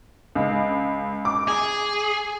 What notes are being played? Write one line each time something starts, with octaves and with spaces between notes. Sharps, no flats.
C#2
D6
G#4